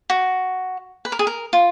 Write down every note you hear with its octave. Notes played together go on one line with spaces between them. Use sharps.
F#4
B4
A#4
G#4
A#4
F4